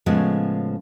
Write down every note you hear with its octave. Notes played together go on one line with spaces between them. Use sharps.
A2 C#3 F3 G#3 B3